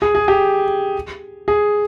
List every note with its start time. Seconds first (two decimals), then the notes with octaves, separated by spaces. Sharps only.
0.02 G#4
0.15 G#4
0.28 G4
1.48 G#4